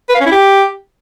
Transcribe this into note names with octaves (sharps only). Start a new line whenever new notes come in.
B4
F5
C#4
E4
G4